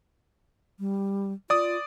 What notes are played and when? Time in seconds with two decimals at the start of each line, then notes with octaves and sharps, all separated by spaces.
0.79 G3
1.50 F4 D5 D#6